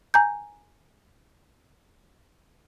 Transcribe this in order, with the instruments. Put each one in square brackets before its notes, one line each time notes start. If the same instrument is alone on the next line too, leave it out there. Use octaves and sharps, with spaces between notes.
[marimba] G#5 A#5 G6